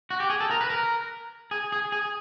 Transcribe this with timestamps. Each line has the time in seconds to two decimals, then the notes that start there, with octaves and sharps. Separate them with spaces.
0.10 F#4
0.20 G4
0.30 G#4
0.40 A4
0.51 A#4
0.61 B4
0.70 A#4
1.51 G#4
1.72 G#4
1.92 G#4